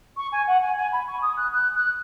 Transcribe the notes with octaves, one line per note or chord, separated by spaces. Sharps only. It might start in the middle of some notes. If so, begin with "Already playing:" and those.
C#6
G#5
F#5
G#5
G#5
B5
C#6
D#6
F#6
F#6
F#6